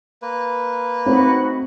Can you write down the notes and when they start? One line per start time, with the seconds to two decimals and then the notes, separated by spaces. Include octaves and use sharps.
0.22 A#3 B4
1.06 A3 C4 D#4 F#4 B5